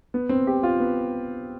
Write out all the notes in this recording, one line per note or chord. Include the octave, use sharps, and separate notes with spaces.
B3
C4
G4
F4
B3